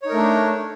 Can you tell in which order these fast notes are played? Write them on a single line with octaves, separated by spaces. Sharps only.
C#5 D#4 A#4 A3 D4